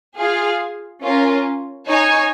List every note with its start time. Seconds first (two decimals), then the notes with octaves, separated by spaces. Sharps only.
0.17 F4 G#4 F5 G#5
1.03 C#4 F4 A#4
1.88 D#4 C#5 G#5